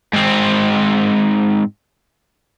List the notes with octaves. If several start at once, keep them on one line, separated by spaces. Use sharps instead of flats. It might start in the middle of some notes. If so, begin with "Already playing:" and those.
G#2 C4